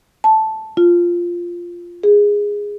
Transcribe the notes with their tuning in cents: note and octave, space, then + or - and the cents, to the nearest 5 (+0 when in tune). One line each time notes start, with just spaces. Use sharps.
A5 -5
F4 -5
G#4 -10